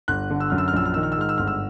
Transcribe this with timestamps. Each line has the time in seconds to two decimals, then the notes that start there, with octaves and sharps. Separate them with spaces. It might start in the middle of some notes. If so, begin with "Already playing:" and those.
0.08 G1 F#6
0.30 D3
0.40 E6
0.50 F#2 F6
0.58 E6
0.68 F6
0.73 A#1 E6
0.85 F6
0.94 D#3 E6
1.03 F6
1.12 E6
1.17 G#2 F6
1.29 E6
1.38 G1 F6
1.47 E6